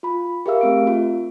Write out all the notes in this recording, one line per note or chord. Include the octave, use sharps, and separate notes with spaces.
F4 B5
G4 G#4 A#4 E5 F5 E6
A3 C4 D7
F4